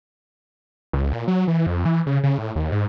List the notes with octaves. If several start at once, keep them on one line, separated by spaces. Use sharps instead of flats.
C#2
A#2
F#3
E3
F2
E3
C#3
C#3
A2
D#2
G#2